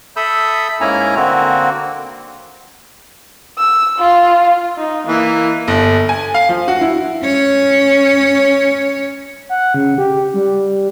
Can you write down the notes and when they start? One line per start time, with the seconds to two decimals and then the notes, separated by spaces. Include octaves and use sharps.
0.16 A4 E5 B5 D#6 E6 G6
0.81 G#2 A#3 C#4 E4 G#5 A#5
1.16 D3 A#3 C4 F#4
3.58 E6
3.98 F4
4.78 D#4
5.07 E3 A#3
5.68 G1
6.09 G#5
6.34 F5
6.49 F3
6.68 F#4
6.81 E4
7.24 C#4 C#5
9.49 F#5
9.74 C#3
9.98 G4
10.34 G3